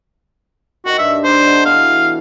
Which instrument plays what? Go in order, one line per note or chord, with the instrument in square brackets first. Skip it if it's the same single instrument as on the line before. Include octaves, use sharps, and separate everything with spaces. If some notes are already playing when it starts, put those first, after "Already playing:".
[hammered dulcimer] D#3 [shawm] F#4
[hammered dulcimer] G2 [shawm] E5
[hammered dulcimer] D4 A#4 [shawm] C5
[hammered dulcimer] D#4 A4 F#5
[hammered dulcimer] B2 E3 [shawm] F5